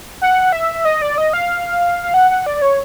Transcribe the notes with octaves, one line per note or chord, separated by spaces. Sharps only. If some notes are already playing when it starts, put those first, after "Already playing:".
F#5
E5
D#5
D5
D#5
F5
F5
F#5
F#5
D5
C#5